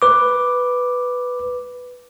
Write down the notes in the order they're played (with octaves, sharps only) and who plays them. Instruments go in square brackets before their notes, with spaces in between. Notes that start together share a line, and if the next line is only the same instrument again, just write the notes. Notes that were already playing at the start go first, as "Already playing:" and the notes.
[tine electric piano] B4 D6